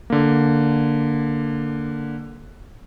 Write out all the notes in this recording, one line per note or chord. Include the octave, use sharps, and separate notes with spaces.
D3 A#3